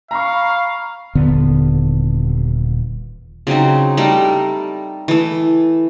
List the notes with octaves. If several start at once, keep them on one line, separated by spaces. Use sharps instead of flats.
F5 A#5 B5 C#6
D#1 D3 B3
C#3 F#3 C4 D#4
G3 A3 D#4 A#4
E3 A3